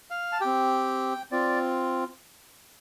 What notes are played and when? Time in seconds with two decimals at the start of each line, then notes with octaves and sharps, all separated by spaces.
0.10 F5
0.32 A5
0.41 C4 G4 G5
1.31 C4 F4 D5